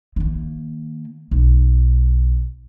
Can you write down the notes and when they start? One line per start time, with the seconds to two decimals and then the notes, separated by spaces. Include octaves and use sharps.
0.16 D#3 A#3
1.31 B1